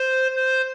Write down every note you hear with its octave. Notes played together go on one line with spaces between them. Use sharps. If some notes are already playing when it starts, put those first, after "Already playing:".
Already playing: C5
C5